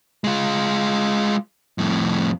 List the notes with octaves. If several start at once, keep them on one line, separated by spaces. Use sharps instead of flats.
G#3 F4
F2 A2